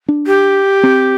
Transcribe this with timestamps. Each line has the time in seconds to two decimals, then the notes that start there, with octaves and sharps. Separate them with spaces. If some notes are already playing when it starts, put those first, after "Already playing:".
0.08 D4
0.27 G4
0.83 C4